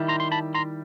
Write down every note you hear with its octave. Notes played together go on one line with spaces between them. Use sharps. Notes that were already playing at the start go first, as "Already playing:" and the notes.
Already playing: D#3 G3 E4
A#5 C6
C6
A5 B5
A#5 C6